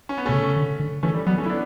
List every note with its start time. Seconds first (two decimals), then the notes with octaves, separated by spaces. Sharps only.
0.09 C#4
0.18 B3
0.26 B2 A3 C#4
0.33 C#3
0.56 D3
0.80 D3
1.03 E3 A3 C#4
1.14 G3
1.26 F#3 G3 B3
1.38 A3 C#4
1.46 E4
1.49 B3 D4